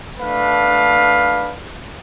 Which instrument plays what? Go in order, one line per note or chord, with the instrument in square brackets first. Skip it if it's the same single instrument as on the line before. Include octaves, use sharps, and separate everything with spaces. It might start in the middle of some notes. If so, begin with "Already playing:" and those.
[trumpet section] A3 D4 B4 F5